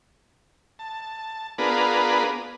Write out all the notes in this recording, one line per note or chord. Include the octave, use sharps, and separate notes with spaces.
A5
B3 D4 F4 G#4 A#4 B4